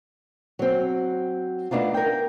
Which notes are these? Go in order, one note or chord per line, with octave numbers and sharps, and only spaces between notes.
F#3 C4
A3 B3 D4 D#4 F4
A#4 G5